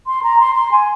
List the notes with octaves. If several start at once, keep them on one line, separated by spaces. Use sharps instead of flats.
C6
A#5
C6
C6
G#5